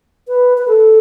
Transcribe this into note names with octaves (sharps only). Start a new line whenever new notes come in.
B4
B4
A4